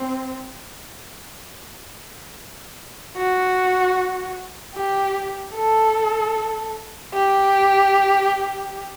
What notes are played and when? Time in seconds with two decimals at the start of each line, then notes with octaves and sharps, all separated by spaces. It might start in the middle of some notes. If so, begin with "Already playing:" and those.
Already playing: C4
3.16 F#4
4.75 G4
5.55 A4
7.14 G4